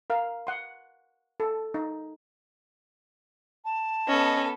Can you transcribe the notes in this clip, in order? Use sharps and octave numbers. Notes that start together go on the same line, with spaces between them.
A#4 F5
F#5 C6
A4
D#4
A5
B3 C#4 A4 D#5